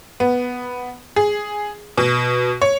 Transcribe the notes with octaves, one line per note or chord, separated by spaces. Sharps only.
B3
G#4
B2
C#5